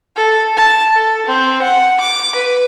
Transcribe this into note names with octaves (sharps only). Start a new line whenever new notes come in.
A4
A5
A4
C4
F#5
D6
B4